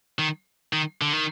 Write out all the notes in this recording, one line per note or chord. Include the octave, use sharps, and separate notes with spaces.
D#3
D#3
D3
D#3